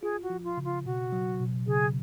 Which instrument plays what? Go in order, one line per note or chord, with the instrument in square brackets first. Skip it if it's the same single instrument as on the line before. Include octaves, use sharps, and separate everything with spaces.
[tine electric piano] F4 [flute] G#4
[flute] F#4
[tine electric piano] F3
[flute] F4
[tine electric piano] C#3
[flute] F4
[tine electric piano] B2 [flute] F#4
[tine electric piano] F#3
B2
[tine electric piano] C#3 [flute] G#4